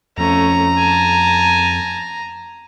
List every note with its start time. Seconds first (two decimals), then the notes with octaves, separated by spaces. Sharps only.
0.18 F2 A3 C#4 A#5
0.78 G#5 A5